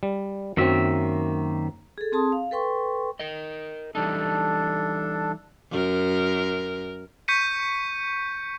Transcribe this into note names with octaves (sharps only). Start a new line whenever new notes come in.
G3
F#2 D#3 F#3 A#3 C4 E5
G#4 A4
C4 G#4 A5 C6 D#6
F5
A4 B4 G5 C6 C#6
A#4 D#5
E3 G3 D4 D#4 A4
F#2 A#4
C#6 G6 B6 C#7 D#7